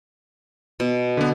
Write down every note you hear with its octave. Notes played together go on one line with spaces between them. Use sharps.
B2
D3 B3